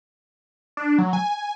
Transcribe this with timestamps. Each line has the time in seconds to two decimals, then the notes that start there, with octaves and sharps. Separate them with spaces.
0.77 D4
0.98 F#3
1.13 G#5